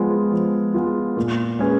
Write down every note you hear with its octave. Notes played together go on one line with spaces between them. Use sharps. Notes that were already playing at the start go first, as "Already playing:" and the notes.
Already playing: F3 G#3 B3 F4
F3
G#3 B3 F4
A#2
G#3 C#4 G#4 B4